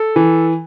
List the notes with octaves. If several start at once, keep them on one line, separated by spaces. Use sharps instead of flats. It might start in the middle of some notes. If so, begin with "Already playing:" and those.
Already playing: A4
E3